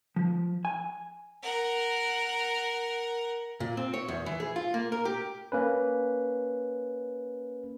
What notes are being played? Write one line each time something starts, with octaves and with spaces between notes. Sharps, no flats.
F3
G#5
A#4 F#5
A#2
C4
C#5
E2
E3
G#4
F4
A#3
A#4
G4
A#3 C#4 B4